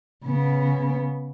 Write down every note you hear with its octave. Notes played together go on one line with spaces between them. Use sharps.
C#3 B3